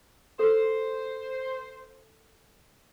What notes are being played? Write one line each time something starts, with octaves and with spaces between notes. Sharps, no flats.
A4 C5 C6